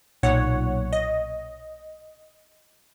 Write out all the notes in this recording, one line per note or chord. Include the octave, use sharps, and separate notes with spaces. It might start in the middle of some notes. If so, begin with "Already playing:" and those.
B1 A#2 C#5 F#5
D#5